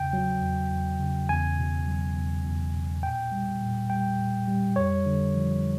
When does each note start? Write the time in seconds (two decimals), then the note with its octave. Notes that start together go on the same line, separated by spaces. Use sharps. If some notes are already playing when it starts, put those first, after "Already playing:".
Already playing: E2 C#3 G5
0.13 F#3
0.42 E2
0.71 E2
1.00 C#3
1.29 E2 G#5
1.58 B2
1.87 F#3
2.16 E2
2.45 E2
2.73 B2
3.03 A#2 G5
3.32 G3
3.61 A#2
3.90 G3 G5
4.19 A#2
4.48 G3
4.76 F2 C#5
5.06 D3
5.35 F3